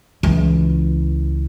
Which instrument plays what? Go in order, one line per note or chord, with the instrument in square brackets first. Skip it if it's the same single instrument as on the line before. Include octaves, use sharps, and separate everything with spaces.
[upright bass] C#2 E3